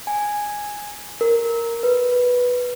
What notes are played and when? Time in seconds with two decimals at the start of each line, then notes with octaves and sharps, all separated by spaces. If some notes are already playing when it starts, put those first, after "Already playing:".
0.07 G#5
1.21 A#4
1.83 B4